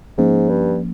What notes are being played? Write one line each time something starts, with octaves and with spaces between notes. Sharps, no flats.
G#2 F3 A#3 C#4
G2